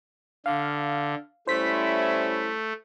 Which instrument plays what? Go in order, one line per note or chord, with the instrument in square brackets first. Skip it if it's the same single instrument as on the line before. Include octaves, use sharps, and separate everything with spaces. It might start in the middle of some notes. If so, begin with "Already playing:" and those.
[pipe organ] D3 [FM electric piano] F5
[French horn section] G3 C#4 E4 [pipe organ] A3 [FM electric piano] C5 B6